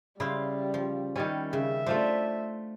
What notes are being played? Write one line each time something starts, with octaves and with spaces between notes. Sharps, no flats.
C#3 G3 E4 C5 F5
F3
D#3 G3 C#4 E4
C#3 E5
A3 D4 F4 C5